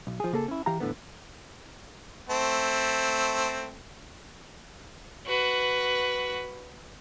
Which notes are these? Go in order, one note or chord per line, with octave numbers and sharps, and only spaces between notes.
B1
F3 G#4
C#3 A#3 G#4 A4
C#4 E4
E3 G4 F5 A#5
E2 A2 D3 B3
A3 C4
F#4 B4